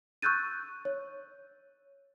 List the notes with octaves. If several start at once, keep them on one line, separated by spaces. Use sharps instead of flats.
C#6 E6 F#6 G6 A6 D#7
C#5